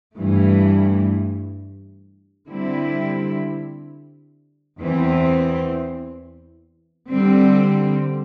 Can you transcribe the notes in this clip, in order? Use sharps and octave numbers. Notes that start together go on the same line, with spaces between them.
G2 E3 A3
D3 G3 C4 E4
E2 E3 C4
D3 G3 C4